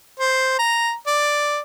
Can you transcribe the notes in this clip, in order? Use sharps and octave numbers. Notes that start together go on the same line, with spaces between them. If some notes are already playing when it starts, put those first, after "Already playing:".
C5
A#5
D5